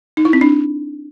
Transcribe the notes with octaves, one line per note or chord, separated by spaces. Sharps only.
D#4
E4
C4
D4